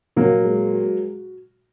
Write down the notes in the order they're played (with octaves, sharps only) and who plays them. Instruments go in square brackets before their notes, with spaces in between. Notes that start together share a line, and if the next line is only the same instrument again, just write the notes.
[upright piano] A#2 [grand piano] F#3 A#3
[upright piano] G#3
F#4